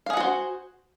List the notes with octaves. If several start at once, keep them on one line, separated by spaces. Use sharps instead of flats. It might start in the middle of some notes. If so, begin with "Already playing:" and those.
F#4 G#4 C5 F5 F#5